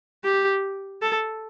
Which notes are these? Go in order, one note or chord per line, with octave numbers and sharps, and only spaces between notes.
G4
A4